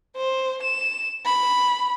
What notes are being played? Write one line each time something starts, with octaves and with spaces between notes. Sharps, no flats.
C5
E7
B5